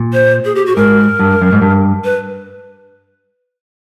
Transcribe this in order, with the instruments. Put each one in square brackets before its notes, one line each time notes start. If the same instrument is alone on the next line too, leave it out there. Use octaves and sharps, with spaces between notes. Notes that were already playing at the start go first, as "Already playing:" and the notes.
Already playing: [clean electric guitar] A#2
[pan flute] C5
G#4
G4
F#4
[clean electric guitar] G#2 [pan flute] A#4
[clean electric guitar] G2
F#2
G#2
G2
[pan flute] B4